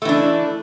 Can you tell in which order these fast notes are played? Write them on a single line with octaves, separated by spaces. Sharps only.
A3 E3 D4